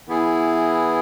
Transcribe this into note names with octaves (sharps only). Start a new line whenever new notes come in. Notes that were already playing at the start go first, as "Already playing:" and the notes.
E3 B3 E4 G#4